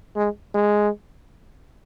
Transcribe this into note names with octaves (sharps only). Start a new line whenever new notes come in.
G#3
G#3